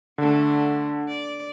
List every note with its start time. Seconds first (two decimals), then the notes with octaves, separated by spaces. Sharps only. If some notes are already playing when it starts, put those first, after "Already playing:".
0.18 D3 A3 D4
1.08 D5